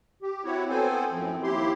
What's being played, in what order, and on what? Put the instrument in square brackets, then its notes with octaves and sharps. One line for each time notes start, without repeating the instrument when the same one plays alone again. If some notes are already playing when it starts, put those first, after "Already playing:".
[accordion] G4
C4 E4 F#4 C#5
B3 C4 A4 C5 G#5
F#2 A2 F3 C4
D#2 E4 G4 C6